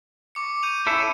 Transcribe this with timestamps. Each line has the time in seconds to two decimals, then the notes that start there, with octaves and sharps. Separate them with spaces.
0.35 C#6 D6 C#7
0.63 G6 D#7 F7
0.86 C#4 E4 A4